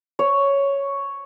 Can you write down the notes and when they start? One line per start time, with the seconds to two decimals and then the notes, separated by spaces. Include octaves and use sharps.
0.19 C#5